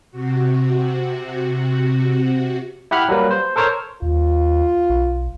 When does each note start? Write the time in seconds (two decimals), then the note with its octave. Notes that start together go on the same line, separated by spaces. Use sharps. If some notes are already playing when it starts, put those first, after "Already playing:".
0.11 C3 F#4
2.91 E4 G4 F#5 B5 F6
3.09 F#3 G3 A#3 B4
3.31 C5
3.56 A4 A#4 C5 C#5
4.02 D#2 F4
4.90 B1